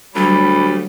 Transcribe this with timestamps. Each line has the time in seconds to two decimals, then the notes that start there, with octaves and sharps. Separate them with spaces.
0.15 D2 F#3 G3 B5